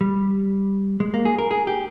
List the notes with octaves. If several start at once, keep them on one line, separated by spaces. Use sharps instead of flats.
G3
G#3
A#3
G#4
A#4
G#4
G4